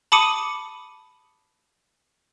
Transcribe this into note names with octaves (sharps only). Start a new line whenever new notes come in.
A5 B5 D6 D#6 C#7 D#7